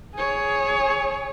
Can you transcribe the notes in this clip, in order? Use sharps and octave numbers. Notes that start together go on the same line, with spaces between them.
G#4 C#5